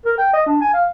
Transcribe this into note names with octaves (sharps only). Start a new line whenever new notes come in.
A#4
G5
D#5
D4
G#5
F5